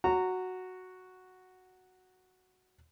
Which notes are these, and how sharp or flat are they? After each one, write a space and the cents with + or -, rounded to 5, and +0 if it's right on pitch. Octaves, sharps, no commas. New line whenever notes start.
F#4 +0 A#5 -20